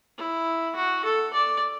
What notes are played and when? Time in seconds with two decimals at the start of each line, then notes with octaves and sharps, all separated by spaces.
0.18 E4
0.75 F#4
1.04 A4
1.33 D5